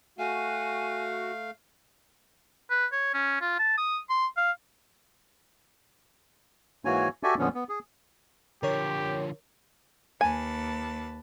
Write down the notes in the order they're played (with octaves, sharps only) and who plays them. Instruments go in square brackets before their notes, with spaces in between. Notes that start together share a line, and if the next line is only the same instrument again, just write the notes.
[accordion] A3 F5 [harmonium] F#4 F#5 [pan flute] G#5
[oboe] B4
C#5
C#4
F4
A5
D#6
C6
F5
[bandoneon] G#2 E3 A#3 F#4 C#5 G#5
F#4 G4 A4 D5 E5 G#5
F2 A#2 D3 F3 B3 C#4
B3
G#4
[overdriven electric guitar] D3 F3 [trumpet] G4 [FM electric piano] A#4 C#5
[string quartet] D#2 B4 A5 [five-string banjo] G#5